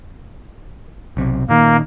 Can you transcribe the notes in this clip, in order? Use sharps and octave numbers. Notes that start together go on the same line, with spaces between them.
B1 C3
A#2 D#3 A#3